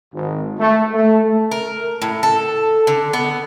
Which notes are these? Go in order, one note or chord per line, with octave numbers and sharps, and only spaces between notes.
G#1
A3
A3
A#4
A2
A4
D3
B3